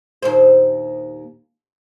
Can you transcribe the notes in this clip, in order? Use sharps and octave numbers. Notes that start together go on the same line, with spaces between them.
D#2 A#2 C5